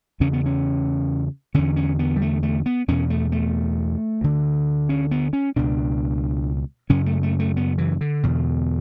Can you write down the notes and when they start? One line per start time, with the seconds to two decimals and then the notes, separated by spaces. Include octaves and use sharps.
0.20 E2 C#3 C#4
0.33 B3
0.46 C#4
1.54 E2 D3 C#4
1.76 C#4
1.99 B3
2.16 G3
2.22 A3
2.43 A3
2.66 B3
2.88 E2 B2 C#4
3.10 A3
3.32 A3
4.21 D2 D3
4.89 C#4
5.11 B3
5.33 C#4
5.56 C#2 B2 D4
6.90 F#2 C#3 C#4
7.06 A3
7.23 A3
7.40 A3
7.57 B3
7.78 E3
8.01 D3
8.23 E2 B2